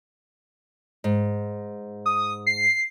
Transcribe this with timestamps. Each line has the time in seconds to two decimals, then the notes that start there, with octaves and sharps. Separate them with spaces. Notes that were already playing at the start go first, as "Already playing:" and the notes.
1.04 G#2
2.06 D#6
2.47 C7